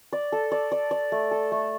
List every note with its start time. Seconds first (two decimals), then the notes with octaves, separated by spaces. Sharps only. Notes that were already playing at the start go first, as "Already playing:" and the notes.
0.13 D5
0.32 A4
0.52 D5
0.72 D5
0.91 D5
1.12 A3
1.31 A4
1.52 A3